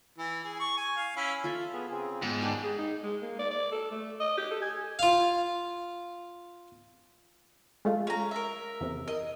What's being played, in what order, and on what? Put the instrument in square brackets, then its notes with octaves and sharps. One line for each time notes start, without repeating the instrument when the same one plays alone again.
[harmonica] E3
G#4
C#6
G#5
F5
C#4 E4
[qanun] F4 A4 E5
[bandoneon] B3 G#4
C#3 C4 G#4
[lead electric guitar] G#2 [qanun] B3
[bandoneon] D#3 D4 G4 [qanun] B4
[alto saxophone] G#4
D#4
G#3
A#3
D5
D5
A4
A3
D#5
G4
A4
G#5
[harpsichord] F4 F5
[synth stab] G#3 A3 F4
[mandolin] C#4 A#5
A#4 E5
[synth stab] E2 C3
[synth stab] A#4 [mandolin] D#5